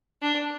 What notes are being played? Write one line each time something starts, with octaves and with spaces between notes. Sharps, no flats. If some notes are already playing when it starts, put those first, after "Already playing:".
D4